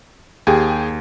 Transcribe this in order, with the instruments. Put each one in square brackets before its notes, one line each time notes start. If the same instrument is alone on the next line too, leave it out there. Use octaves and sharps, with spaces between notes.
[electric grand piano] D#2 [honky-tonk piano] G4 G#4